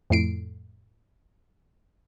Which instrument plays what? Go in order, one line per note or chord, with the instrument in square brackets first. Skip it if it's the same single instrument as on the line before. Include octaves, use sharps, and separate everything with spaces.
[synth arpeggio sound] F2 A2 C7 D7